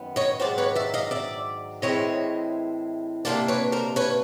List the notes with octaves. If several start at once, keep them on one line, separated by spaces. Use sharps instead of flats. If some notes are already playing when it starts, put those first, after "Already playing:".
Already playing: F#2 D#3 B3
C#5 D#5
G#2 D#3 F#3 C5 D5
B4 C#5
D5 E5
D#5 F5
D5 E5
A2 E3 G#3 C4 E4 C#5 D#5
C3 F3 A#3 D4 C5 D5
B4 C#5
A#4 C5
B4 C#5